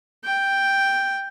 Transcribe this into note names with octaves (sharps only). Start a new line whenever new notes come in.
G5